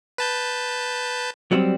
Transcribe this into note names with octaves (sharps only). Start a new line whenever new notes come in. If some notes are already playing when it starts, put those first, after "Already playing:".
B4 A5 G6
F#3 G3 C4